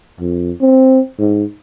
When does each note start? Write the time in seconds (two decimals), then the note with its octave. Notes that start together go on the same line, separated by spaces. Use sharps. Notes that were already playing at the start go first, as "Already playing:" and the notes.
0.20 F2
0.61 C4
1.19 G#2